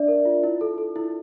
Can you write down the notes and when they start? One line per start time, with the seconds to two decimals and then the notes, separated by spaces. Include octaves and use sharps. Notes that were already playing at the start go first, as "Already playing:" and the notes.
Already playing: D4 D5 E5
0.08 A#4
0.25 F4
0.43 E4
0.61 A4
0.78 A4
0.96 E4